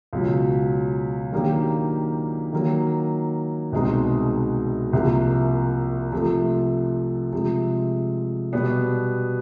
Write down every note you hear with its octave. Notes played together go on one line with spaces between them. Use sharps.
C#2 B2 F#3
D#3 F#3 A#3 D4 G4
D#3 F#3 A#3
C2 B2 G#3 C4 D#4
C2 C3 F3 A#3
C3 F3 A3
C3 F3 G#3
B2 G3 B3